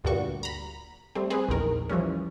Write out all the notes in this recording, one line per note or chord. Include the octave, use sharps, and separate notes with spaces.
D2 G2 A#2 G3 F#4 C#6
A#5 B5
G3 A3 C4
C4 G#4 B4
A#1 E2 D#3 A#4
E3 F3 G3 C#4